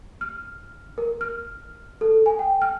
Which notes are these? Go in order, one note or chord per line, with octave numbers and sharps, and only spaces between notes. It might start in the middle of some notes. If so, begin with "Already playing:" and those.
F6
A#4
F6
A4
G#5
G5
F6